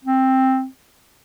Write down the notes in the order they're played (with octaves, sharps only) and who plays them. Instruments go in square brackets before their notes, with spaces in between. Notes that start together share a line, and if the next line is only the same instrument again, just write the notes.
[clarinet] C4